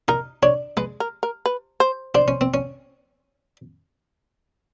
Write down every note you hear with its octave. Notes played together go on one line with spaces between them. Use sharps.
D#4 A#4
D4 C#5
G#3 B4
A#4
A#4
B4
C5
D4 C5
C#4
C4
C#4